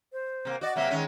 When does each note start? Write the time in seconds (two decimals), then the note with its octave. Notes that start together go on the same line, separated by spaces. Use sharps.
0.13 C5
0.45 C3 A#3
0.61 F#4 D5 D#5
0.76 C3 F#3 A#3 E5
0.91 D#3 G#3 C#4